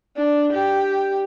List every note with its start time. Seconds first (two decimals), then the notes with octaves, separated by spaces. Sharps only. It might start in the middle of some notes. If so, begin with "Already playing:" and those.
0.17 D4
0.53 G4